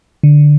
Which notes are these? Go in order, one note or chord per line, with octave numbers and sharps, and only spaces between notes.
D3